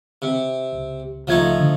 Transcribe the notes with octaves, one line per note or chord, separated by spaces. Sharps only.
C3
C#2
C#2 F3 A3 D#4 E5 G#6
D3